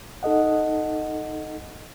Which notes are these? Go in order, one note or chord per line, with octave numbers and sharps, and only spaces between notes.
D#4 A4 D#5 F#5